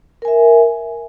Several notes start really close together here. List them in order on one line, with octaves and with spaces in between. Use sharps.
A#4 G#5 E5